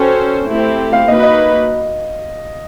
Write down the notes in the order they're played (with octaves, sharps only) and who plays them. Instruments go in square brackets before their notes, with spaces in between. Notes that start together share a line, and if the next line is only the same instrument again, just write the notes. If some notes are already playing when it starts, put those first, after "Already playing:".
Already playing: [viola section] C#4 F#4 A4 C5 [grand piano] G5
[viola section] A3 C4 E4 G4
[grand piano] F5
[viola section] A#3 D#4 F#4 B4 [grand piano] D#5
[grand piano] D#5